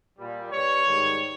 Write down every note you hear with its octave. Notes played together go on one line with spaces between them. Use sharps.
A#2 G3
G2 G3 C#5
G#2 D#3 G3